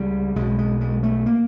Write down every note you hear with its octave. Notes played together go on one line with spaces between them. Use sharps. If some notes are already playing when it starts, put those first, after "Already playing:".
Already playing: C#2 C#3 G3
B1 B2 G#3
G#3
G#3
A3
A#3